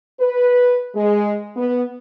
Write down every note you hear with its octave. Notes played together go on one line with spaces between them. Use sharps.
B4
G#3
B3